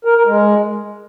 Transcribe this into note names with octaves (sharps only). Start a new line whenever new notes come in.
A#4
A#4
G#3